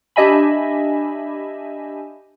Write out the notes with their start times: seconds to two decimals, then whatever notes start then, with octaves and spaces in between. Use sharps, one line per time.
0.16 D4 G4 D#5 E5 G#5 B5